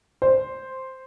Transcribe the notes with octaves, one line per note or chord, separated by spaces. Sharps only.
C5